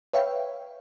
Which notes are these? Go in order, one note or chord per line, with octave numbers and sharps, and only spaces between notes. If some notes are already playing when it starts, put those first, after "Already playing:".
B4 C#5 E5 F5 G5